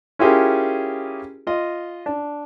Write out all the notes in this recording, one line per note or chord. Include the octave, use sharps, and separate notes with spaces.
C#4 E4 F4 G4 G#4 A#4
F4 D#5
D4